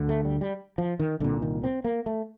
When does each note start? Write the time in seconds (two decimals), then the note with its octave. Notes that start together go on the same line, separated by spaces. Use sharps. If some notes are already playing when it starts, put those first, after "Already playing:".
Already playing: D2 D3
0.09 A3
0.25 G3
0.41 G3
0.78 F3
1.00 D#3
1.20 C2 A#2 D3
1.42 D#3
1.64 C4
1.84 A#3
2.06 A3